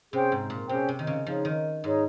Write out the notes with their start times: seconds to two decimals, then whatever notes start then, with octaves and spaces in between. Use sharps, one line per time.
0.13 C3 C#4 G#4 C5 G5
0.32 G#2
0.50 A#2
0.69 C3 C#4 G#4 C5 G5
0.89 C3
0.99 D#3
1.07 C#3
1.26 F3 D#4 G#4 C#5
1.45 D#3
1.84 G#2 D#4 G#4 C#5